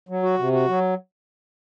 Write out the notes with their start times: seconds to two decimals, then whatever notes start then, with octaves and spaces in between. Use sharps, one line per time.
0.09 F#3
0.23 F#4
0.39 C3
0.53 F#4
0.68 F#3